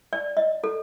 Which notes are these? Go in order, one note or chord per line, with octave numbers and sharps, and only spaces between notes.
D5
D#5
A4